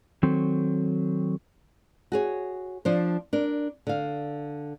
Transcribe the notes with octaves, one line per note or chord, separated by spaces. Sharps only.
D#3 F#3 C4 A4
F#4 G#4 C#5
F3 D4 C5
D4 A#4
D3 F5